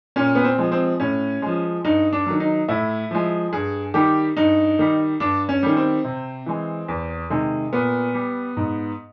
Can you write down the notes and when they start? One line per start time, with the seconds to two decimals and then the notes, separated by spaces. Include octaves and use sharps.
0.16 A#2 C#4
0.35 B3
0.44 C4
0.58 F3 G#3
0.72 C4
1.00 A2 C#4
1.42 F3 G#3
1.85 G2 D#4
2.13 D4
2.26 D#3 F#3
2.40 D#4
2.68 A2 E4
3.11 F3 G#3
3.52 G2 G#4
3.94 D#3 G3 G4
4.37 G2 D#4
4.79 D#3 G3
5.20 G2 D4
5.49 C#4
5.63 D#3 G3
5.77 C4
6.04 C3
6.46 E3 G#3
6.88 E2
7.30 C3 D#3 G#3
7.73 A#2 B3
8.14 G3
8.57 G#2